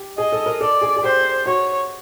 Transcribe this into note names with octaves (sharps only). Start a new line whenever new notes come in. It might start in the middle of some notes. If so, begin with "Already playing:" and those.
Already playing: G4
G#4 D#5
A4
A#4
A4 D5
G#4
G#4
G4 C5
F#4 C#5